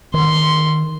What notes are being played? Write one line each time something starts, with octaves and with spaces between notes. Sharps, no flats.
D#3 C6